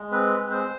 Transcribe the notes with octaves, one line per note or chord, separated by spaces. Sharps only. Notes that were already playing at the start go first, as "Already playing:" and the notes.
Already playing: G#3
C4 B4
G#3
C5